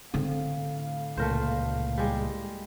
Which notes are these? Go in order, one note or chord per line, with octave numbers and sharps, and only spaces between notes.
A2 D3 C4 F5
C#2 A#2 A3 A#4 C5
G3 G#3